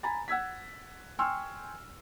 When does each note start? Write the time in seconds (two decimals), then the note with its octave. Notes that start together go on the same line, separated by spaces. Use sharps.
0.03 G#5 A#5 B5 A6
0.28 F#5 E6 G#6 B6
1.19 G5 G#5 C6 C#6 E6 F6